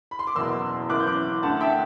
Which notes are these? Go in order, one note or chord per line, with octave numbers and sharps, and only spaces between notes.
B5
C6
D6
F#1 E2 B2 C6 E6
F#1 F#2 E3 D6 F#6
G6
D6 F#6
D2 D3 F#5 A5
E5 G5